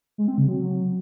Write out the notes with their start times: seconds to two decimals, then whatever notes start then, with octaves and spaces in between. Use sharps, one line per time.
0.18 G#3
0.28 C4
0.38 C#3
0.48 F#3